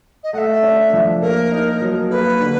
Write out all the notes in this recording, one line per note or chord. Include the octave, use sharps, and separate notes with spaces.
D#5
A3 E5 F#5
D4
F3
A#3 A#4
D#4
F#3
A#3 B4
D3